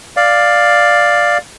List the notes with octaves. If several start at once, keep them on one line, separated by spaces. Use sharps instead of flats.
D5 F5